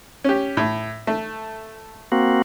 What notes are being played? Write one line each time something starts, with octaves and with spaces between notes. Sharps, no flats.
C#4 G4
A2
A3
A#3 C4 F#4